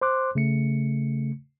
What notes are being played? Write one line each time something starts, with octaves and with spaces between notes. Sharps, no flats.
C5 C6 D6 F#6
C#3 A3 C#7